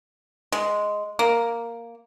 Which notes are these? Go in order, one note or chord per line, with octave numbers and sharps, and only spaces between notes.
G#3
A#3